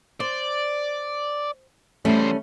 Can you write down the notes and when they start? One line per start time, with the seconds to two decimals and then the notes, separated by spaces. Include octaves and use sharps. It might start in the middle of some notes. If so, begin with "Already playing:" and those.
0.20 C5 D5
2.05 E2 G3 A3 C#4 C5